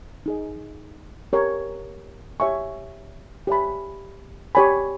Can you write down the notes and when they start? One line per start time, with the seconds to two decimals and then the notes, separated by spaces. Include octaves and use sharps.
0.26 D#4 G#4 D#5
1.33 G4 A#4 C#5
2.40 G4 C#5 E5 G#5 C#6
3.47 G4 C#5 E5 G#5 B5
4.55 G4 C#5 G#5 B5